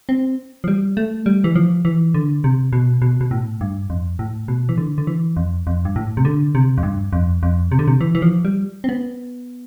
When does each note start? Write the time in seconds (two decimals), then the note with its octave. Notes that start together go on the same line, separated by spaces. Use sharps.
0.09 C4
0.64 F3
0.68 G3
0.97 A3
1.26 G3
1.44 E3
1.56 F3
1.85 E3
2.14 D3
2.44 C3
2.73 B2
3.02 B2
3.21 B2
3.31 A2
3.61 G2
3.90 F2
4.19 A2
4.48 B2
4.69 E3
4.78 D3
4.98 D3
5.07 E3
5.37 F2
5.67 F2
5.85 G2
5.96 A2
6.17 C3
6.25 D3
6.55 C3
6.78 F2
6.83 G2
7.13 F2
7.43 F2
7.72 C3
7.79 D3
7.88 C3
8.01 E3
8.15 E3
8.22 F3
8.45 G3
8.84 C4
8.89 B3